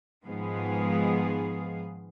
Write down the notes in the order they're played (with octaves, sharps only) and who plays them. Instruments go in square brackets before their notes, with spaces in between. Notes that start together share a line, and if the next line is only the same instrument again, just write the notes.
[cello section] G#2 D#3 F3 B3 G#4 F5